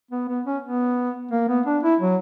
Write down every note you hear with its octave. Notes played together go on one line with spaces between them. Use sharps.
B3
B3
C#4
B3
A#3
B3
D4
E4
F#3